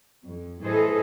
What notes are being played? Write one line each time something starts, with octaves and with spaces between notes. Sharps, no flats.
F2
A2 E3 G#4 A4 C5 D#5